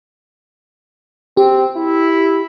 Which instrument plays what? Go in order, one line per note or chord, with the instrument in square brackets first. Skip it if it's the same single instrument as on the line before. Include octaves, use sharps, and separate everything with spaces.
[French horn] C4 [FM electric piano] G4
[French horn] E4